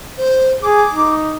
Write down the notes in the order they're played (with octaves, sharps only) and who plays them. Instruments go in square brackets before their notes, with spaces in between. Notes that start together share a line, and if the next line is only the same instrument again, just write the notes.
[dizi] C5
[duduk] G#4 [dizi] D6
[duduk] D#4